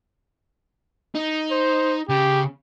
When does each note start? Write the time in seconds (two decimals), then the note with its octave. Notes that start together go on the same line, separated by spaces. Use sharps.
1.15 D#4
1.51 C5
2.09 C#3 G4